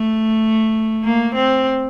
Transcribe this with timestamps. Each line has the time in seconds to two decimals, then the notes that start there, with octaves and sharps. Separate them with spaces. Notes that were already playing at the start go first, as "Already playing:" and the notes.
Already playing: A3
1.04 A#3
1.35 C4